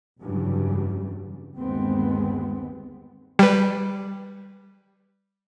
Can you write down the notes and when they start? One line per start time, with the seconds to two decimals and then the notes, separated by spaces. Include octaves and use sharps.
0.21 F1 G2 C#3 E3 F#3 G3
1.58 G1 D#2 G#3 B3 C4
3.39 G3 B4